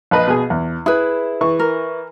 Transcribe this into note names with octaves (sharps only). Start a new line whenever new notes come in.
A#1 B4 D#5
B2 G#4
E2
E4 G#4 B4
E3 C#6
A#4